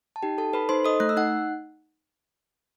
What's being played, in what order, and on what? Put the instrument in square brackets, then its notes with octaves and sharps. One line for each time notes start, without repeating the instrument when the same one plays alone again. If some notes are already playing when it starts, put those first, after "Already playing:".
[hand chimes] A5
D#4 G4 G5
D#4 A4 A5
A4 B4 B5
D#4 C5 C6
A4 D#5 D#6
A3 F#6
E6
D#4 F#5 F#6